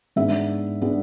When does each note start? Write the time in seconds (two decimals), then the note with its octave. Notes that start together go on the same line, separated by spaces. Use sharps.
0.16 G#2 G#3 B3 D4 E5
0.81 G#3 B3 D4